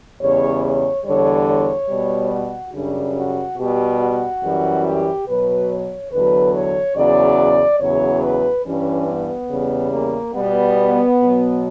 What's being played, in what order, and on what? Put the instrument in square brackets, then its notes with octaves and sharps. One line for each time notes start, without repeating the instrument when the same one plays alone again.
[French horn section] E2 C#3 G3 C#5
C#5
E2 D3 G3 C#5
C#5
B2 G3
F#4
F#2 C#3 G3 D4
F#4
B2 G3 G4
F#4
F#2 E3 G3
G4
B2 F#3 B4
C#5
E2 D3 F#3 B4
C#5
E2 C#3 F#3 D5
E2 C#3 F#3 C#5
B4
G2 E3 G3 C#4
B3
E2 C#3 G3
A#3
B2 G3 B3
B2 F#3